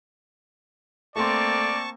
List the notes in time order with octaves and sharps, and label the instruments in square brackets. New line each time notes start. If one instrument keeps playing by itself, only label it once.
[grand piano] A3 C6 [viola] A#3 C4 [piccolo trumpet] D5 [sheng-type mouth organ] A5 C#6